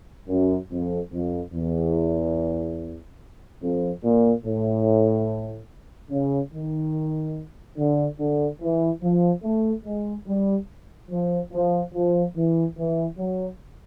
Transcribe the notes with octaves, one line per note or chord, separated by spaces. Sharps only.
F#2
F2
F2
E2
F2
A#2
A2
C#3
D#3
D3
D3
E3
F3
A3
G#3
G3
F3
F3
F3
E3
E3
F#3